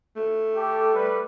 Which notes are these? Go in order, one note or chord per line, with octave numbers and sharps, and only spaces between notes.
A3
G4 A4
G3 B4